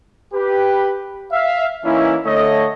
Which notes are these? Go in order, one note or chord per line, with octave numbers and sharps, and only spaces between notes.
G4 B4
E5 F5
E3 A#3 C#4 D#4 E4
D3 A3 C#5 D#5